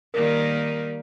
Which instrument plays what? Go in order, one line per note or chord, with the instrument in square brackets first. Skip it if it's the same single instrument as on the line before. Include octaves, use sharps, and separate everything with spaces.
[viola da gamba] D#3 G3 A#3 [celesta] A#4